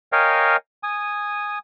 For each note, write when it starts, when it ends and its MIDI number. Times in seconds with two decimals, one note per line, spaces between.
0.12 0.56 70
0.12 0.56 73
0.12 0.56 75
0.12 0.56 77
0.12 0.56 79
0.12 0.56 80
0.83 1.59 80
0.83 1.59 87